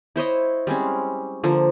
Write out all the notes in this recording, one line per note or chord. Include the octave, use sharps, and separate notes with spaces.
E4 C5 C#5 D#5
G3 G#3 C4 C#4
D3 F3 A#3